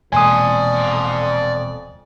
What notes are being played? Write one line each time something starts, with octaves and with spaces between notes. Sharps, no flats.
E1 F2 A#2 D5 G#5 C6 D#6